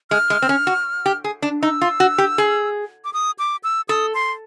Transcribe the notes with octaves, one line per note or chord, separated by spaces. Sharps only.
G#3 F6
G#3
C4
C#4
F#4
G4
G#4
D4
D#4 E6
F4
F#4
G4
G#4
D6
D#6
D6
E6
A4 D#6
C6